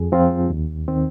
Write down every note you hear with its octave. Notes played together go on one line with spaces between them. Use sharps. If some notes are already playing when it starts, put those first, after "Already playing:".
Already playing: F2 G#4
F3 C4 F4
D#2
D#3 C4